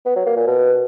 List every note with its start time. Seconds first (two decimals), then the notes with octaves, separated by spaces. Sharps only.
0.06 B3
0.16 F#3
0.26 A#3
0.37 A#2
0.47 B2